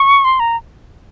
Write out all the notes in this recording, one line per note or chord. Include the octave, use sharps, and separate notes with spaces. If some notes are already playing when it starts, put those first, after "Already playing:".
Already playing: C#6
C6
A#5